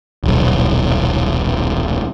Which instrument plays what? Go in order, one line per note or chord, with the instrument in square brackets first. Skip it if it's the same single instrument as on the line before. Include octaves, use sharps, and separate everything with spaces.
[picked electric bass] D#1 B1